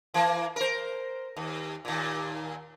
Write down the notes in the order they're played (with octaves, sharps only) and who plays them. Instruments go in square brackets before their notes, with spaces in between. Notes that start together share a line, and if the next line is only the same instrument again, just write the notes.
[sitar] E3 A#3
A#4 C5
D#2
D#2 A#2